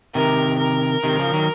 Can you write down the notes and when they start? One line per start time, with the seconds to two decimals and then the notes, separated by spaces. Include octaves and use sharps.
0.15 C3 D#3 A#4
0.59 A#4
1.04 C3 D#3
1.19 C#3 F3
1.33 D#3 F#3